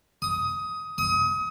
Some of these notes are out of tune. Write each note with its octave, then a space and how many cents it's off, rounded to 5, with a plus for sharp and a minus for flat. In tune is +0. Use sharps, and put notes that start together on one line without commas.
D#6 +15
D#6 +30